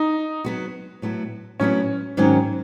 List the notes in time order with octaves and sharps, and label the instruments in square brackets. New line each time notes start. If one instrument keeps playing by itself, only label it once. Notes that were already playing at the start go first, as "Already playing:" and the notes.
Already playing: [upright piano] D#4
[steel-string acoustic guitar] F#3 B3 F#4
A2 F#3 B3 E4
[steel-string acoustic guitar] A2 F#3 B3 E4 [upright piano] C#4
[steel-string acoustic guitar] G#2 D#3 F#3 C#4